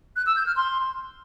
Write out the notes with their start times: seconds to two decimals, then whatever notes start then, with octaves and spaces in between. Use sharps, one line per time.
0.16 F#6
0.26 E6
0.36 G6
0.46 F6
0.56 C6